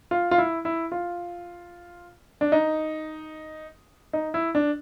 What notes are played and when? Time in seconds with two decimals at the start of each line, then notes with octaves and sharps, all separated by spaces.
0.11 F4
0.31 F4
0.38 E4
0.65 E4
0.92 F4
2.41 D4
2.52 D#4
4.13 D#4
4.34 E4
4.55 D4